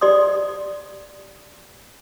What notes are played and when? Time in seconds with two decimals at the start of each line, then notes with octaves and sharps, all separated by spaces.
0.01 G4 D5 C6 D#6